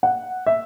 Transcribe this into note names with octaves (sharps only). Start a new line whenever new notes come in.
F#5
E5